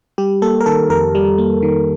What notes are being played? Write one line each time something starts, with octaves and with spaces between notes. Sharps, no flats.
G3 G4
A#3 A4
A#4
D#3 A4
F2 A#4
G3
A#3
D#3